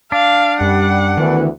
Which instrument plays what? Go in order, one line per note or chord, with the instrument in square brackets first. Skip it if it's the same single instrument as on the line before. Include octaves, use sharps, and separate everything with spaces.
[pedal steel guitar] D4 [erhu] F5
[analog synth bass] F#2 [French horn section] G3 [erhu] F#5
[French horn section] D2 E3 B3 [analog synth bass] D#3